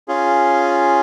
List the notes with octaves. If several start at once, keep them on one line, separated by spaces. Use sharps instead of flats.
C#4 F4 G#4